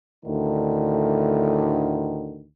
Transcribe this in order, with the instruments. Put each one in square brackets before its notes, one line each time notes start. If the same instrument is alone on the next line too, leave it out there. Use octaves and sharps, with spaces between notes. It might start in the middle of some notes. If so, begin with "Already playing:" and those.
[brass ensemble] D2 A2 D3 D#3